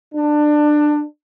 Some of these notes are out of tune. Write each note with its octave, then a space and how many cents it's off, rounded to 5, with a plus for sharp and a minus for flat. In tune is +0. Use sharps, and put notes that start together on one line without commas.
D4 +20